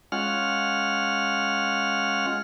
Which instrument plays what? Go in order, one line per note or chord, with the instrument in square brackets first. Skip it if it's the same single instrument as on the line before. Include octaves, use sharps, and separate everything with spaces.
[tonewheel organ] G#3 C#4 F4 F#5 F6